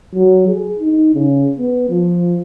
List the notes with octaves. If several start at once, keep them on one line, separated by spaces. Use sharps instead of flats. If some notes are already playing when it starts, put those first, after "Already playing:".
F#3
G#4
D#4
C#3
B3
F3